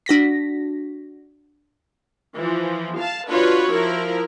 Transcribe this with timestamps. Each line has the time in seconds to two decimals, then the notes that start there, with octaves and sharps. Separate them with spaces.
0.06 D4 F#4 A#6 B6
2.35 E3 F3
2.98 F5 A5
3.29 D4 F4 F#4 B4 C#5
3.71 F3 E4 A#4